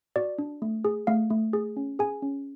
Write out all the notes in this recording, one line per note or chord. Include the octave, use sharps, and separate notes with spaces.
F#4 D5
D4
A3
G#4
A3 F5
A3
G#4
C#4
G#4 G#5
C#4